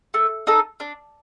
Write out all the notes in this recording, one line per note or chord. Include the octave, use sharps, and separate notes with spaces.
A3
D#4 A4
D4